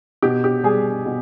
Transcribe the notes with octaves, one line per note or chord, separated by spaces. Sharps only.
B2 G4
G4
G3 G#4
B2